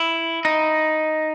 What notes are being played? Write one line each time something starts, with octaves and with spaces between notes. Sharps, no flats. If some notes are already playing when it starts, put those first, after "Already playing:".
Already playing: E4
D#4